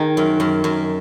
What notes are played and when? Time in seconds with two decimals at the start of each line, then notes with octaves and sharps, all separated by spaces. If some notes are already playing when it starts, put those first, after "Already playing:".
Already playing: D#3 G#4
0.17 F#2
0.40 F#2
0.64 F#2